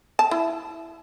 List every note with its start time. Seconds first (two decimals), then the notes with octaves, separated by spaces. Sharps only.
0.19 A5
0.31 E4